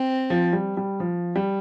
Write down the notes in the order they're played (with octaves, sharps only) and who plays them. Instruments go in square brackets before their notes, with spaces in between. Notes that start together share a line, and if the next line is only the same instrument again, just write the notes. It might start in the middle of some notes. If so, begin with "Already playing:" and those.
Already playing: [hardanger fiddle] C4
[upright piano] F3
G3
G3
F3
G3